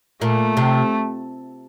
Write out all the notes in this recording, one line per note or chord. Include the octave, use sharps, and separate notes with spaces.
A#2 A3
C3